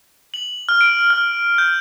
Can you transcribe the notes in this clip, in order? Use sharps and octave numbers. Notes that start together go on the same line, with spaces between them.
F#7
F6
D7
F6
G6